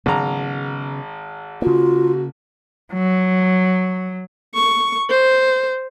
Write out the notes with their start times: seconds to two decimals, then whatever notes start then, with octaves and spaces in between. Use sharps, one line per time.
0.06 G#1 C#3 F#3 B3 A#5
1.62 C#3 A#3 F4 F#4
2.94 F#3
4.55 C#6
5.10 C5